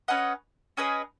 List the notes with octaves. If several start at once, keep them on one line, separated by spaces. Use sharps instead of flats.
C#4 B4 D#5 F#5
C#4 G#4 B4 D#5